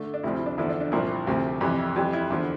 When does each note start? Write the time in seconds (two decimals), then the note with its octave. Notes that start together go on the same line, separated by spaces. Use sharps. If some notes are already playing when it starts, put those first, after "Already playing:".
Already playing: D3 A3
0.14 D4
0.23 D2 C3 F3 E4
0.35 E4
0.46 D4
0.58 E2 D3 F3 E4
0.69 D4
0.80 D4
0.92 C2 A#2 F3 E4
1.27 D2 C3 F3
1.61 F2 C3 E3 G3 G4
1.96 F2 E3 G3 G4
2.13 E4
2.30 E2 D3 F3